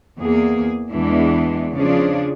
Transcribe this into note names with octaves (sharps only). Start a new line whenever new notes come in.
E2 A#3 G#4
E2 E3 G#3 B3 D4
C#3 F3 D4 G#4